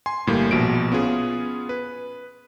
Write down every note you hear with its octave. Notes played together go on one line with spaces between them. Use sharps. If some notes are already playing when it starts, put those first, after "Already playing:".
G#5 C6
G1 A2 G3 A#3
A#1 B2 D7
B3 C#4 F4 G#4
B4